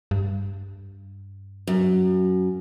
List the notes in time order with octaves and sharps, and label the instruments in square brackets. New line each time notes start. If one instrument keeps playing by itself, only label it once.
[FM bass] G2
[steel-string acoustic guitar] F#2